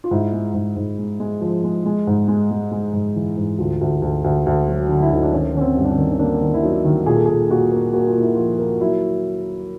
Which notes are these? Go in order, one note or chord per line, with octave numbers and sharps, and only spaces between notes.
F4
G#2 E4
G#3
G#2
G#2
G#3
G#3
F3
G#3
G#3
G#2
G#3
G#3
G#3
G#2
E3
G#2
D2 F4
D2
D2
D2
D2
F#3
D3
E4
D2 D#4
D4
D#3 C#4
D#3 C#4
C4
G2
D4
C#4
D#3
C#4
A#3 D4
D#3
E4
F#3 D#4
D#3
A#2 G#4
A4
A#2 G#4
A#2 F#4
A#3
A#3 F#4
F4
A#2
E4
F3 F4
A#3
F#3 E4